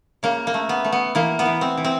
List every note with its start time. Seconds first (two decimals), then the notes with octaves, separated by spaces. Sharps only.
0.23 C#3 A#3
0.47 A#3
0.54 A3
0.69 B3
0.85 A3
0.92 B3
1.15 E3 A#3
1.39 B3
1.46 E3
1.61 C4
1.77 E3
1.84 C4